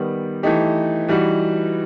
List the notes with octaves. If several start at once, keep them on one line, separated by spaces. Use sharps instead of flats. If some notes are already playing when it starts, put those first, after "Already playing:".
Already playing: D#3 G3 B3
E3 A3 D#4 G4
E3 G3 D#4 F#4